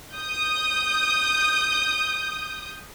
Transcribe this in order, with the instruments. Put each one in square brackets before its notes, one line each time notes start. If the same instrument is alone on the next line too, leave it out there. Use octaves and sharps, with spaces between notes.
[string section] D#6 G6